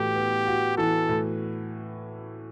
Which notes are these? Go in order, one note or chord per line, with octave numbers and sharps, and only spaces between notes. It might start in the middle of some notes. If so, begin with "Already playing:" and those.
Already playing: A2 E3 B3 F#4 G4
B3
F#4
E3 A4
A2